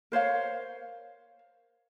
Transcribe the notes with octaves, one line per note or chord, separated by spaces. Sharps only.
A#4 C5 C#5 F5